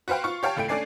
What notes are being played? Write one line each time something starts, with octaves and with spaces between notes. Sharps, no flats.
F#4 B4 C5 F5 G5
F4 C#6
G4 C#5 F5 G5 A5
C#2 A2 A3 G5 D7
A3 C#4 D4 D5 G#5 C7